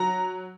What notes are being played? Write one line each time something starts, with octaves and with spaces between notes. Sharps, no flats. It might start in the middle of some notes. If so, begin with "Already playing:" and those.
Already playing: F#3 A#5